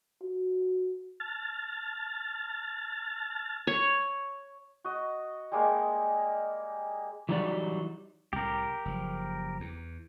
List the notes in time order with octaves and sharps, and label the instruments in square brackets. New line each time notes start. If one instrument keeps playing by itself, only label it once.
[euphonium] F#4
[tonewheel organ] A5 F6 A6
[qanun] C#5
[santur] F#4 D#5
G3 G#3 A#3
[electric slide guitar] E3 F#3 G3 D#4 F#4 D5
[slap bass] C2 A2 [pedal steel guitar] G4 A#4
[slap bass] F#1 F3
E2